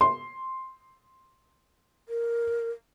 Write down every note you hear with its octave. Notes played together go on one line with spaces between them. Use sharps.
C6
A#4